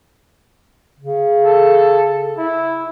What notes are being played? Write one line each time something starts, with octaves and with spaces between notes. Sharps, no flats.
C#3
A4
E4